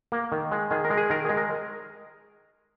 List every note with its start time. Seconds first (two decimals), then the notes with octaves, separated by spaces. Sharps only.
0.12 A#3
0.32 D#3
0.52 G#3
0.71 D#3 G#4
0.85 A#4
0.90 G#3
0.97 G#4
1.10 D#3 A#4
1.25 G#3 G#4
1.37 A#4